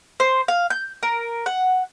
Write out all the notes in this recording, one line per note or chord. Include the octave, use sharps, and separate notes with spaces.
C5
F5
G6
A#4
F#5